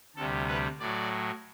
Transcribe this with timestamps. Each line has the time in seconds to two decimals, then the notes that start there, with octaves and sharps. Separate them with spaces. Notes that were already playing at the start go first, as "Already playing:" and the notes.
0.16 D2 C3 G3 A4
0.48 B4
0.80 A2 F#3 D5